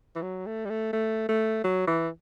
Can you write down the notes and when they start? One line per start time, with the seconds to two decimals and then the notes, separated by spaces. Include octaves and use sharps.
0.15 E3
0.22 F#3
0.46 A3
0.65 G3
0.70 A3
0.93 A3
1.29 A3
1.64 F#3
1.87 E3